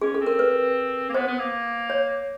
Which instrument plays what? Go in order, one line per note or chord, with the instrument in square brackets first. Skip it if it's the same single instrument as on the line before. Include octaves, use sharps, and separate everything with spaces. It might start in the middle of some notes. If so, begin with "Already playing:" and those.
[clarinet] C#4 [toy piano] G#4
[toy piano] A4
[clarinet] C4
[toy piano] A#4
B4
[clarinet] A#3
[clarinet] B3 [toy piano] C5
[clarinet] B3
A#3
[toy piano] C#5